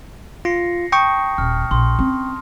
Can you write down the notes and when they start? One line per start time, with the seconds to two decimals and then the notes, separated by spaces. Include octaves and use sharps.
0.45 F4 A#6 C7 C#7
0.92 G5 A5 C#6 D#6
1.38 D#1 F6
1.71 A#1 C6
1.99 C4 C#4